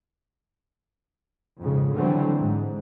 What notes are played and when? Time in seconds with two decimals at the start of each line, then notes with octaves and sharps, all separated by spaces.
1.60 F2 G#2 C#3
1.94 D3 E3 F#3 G3 A3 C4
2.38 G#2